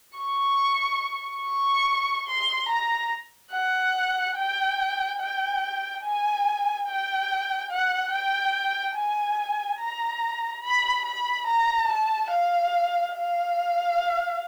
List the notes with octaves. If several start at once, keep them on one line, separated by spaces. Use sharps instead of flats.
C#6
C#6
C6
A#5
F#5
G5
G5
G#5
G5
F#5
G5
G#5
A#5
B5
B5
A#5
A5
F5
F5